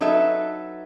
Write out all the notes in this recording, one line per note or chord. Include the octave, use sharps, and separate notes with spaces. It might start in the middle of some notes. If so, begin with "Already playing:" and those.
F#3 D#4 A4 B4 E5